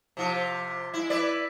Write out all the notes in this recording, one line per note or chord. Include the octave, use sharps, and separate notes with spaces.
C3 F3 F4
G#3 E4
E4 B4 D5